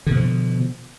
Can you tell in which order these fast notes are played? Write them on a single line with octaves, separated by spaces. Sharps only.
D3 B2 F3